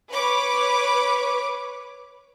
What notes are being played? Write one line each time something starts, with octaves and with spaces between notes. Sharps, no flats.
B4 C#5 D6